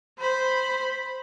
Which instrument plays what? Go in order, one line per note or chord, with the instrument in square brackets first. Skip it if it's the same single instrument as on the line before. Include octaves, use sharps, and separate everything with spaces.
[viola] C5 B5